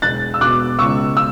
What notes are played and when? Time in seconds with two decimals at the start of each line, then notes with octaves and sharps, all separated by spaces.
0.02 E1 F#6 A6
0.34 E6
0.41 B2 D6 F#6
0.79 C#2 C#6 E6
1.17 E6